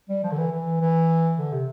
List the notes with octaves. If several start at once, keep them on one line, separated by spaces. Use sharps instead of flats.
G3
F3
D3
E3
E3
E3
D3
C3